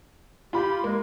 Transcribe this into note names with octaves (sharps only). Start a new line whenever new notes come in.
F4 G4 B5
G#3 A#3